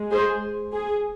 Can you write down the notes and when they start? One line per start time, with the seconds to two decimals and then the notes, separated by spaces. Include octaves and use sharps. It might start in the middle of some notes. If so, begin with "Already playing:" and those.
Already playing: G#3
0.12 G#4 C5
0.73 G#4